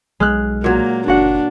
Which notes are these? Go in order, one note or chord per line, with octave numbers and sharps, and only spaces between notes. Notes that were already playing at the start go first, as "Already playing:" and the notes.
B1 G#3 F6 F#6
A#2 F#3 A#3
F#1 D4 F#4 F#5